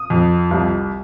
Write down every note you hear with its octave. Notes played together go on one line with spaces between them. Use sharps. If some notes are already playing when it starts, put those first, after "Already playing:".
Already playing: D#6
F2
C2